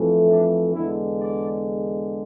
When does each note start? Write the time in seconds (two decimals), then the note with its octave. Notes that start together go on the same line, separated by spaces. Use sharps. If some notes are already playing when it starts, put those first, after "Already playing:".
Already playing: F2 E3 A3
0.29 D4
0.75 E2 D3 G#3 E4
1.20 D5